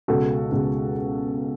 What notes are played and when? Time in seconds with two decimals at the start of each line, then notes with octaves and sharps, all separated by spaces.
0.08 C#2 B2 G#3 F#4 A4
0.51 C#2 B2 G#3